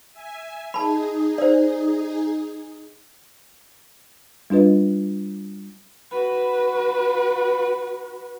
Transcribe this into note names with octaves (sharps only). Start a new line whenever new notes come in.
E5 G#5
D#4 G#4 A5 B5
C5 D5
G3 D4 F4 B4 D#5
F#4 B4